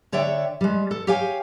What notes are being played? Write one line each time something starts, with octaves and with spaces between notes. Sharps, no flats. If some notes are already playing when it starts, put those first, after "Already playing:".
D3 C#5 D5 E5 G5
G3 G#3
A4
G4 C#5 F5 G5 G#5